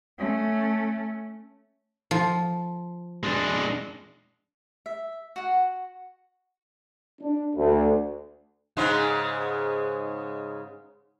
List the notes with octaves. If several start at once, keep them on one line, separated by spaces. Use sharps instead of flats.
A3 C#4
F3
G#3 D4
E5
F#4 F#5
D4
D2
G#2 C#3 G#3